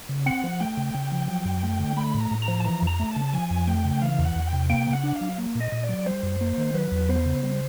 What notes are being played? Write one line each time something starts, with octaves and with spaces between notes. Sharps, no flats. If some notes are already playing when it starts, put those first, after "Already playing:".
C#3
C4 F#5
F3
A3 G5
C#3
C#3
F3
F#3
F#2
A3
D3
A3 B5
A2
A#5
A2
A#5
F3
A5
E3 A#5
F2
A#5
A3
A5
C#3
F3 G#5
F2
A3 G5
C#3
E3 F5
E2
F#5
E2
G5
C3
A#3 G5
C#3
F#5
D4
F5
F#3
A#3
A#2
D#5
A#2
D5
F#3
G3 C5
F#2
A#3
D#3
F#3 B4
E2
B3 C5
C#3
G3